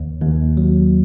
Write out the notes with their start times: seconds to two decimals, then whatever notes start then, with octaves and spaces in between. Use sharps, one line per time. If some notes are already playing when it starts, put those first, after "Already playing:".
Already playing: D#2
0.21 D#2
0.57 F#3